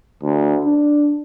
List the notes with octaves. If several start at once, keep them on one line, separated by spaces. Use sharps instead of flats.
D2
D4